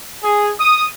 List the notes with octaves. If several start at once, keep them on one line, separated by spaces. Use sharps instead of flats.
G#4
D#6